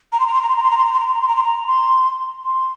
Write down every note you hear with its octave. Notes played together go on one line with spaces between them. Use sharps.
A#5
C6
A#5
C6
A#5
C6
A#5
C6
A#5
C6
A#5
C6
A#5
C6
A#5
C6
A#5
C6
A#5
C6
C6